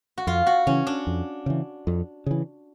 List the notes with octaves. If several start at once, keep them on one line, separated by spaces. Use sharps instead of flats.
F#4
F2 F4
F#4
C#3 E3 C#4
D4
F2
C#3 E3
F2
C#3 E3